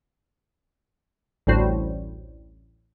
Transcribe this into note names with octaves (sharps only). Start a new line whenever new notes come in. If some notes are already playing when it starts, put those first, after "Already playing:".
A1 D2 A2 G3 F#4 C5